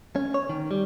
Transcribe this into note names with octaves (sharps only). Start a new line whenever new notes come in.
C#4
C#5
D#3
G3